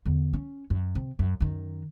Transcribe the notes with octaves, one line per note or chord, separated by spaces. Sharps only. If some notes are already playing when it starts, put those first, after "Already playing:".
E2 D3
C#4
F#2
C3
F#2
F#2 D#3